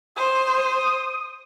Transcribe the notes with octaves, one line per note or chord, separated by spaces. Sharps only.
C5 D#6